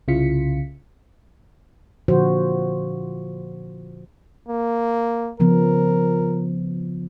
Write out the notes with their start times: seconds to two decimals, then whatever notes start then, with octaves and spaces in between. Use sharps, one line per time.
0.08 C2 C#3 E4 F4 B6 C#7
2.08 A#2 D3 F3 F#4 C5
4.48 A#3
5.40 C#3 F3 B3 A#4